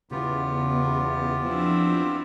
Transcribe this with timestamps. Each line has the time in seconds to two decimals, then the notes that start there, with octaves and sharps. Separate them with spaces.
0.11 E2 C#3 B3 F4 G4
1.45 F3 C4 D4 E4